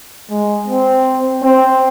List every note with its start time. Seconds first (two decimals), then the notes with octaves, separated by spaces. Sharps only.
0.30 G#3
0.68 C4
1.42 C4